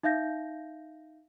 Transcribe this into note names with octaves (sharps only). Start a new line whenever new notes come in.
D#4 E5 F5 G6 A#6